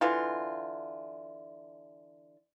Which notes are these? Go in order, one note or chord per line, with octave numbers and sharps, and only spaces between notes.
D3 E3 F4